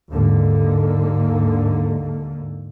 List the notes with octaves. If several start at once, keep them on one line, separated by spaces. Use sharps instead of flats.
D#2 G#2 D3 A#3